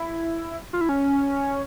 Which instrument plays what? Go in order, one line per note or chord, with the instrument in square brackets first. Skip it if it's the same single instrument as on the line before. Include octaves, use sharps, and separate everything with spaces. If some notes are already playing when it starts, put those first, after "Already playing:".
Already playing: [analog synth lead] E4
F4
E4
C#4